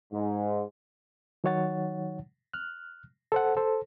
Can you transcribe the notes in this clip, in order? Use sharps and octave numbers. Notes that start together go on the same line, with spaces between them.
G#2
D#3 F#3 D#4 C#5 F#5 A6
F6 F#6
A4 C5 F#5
A4 C5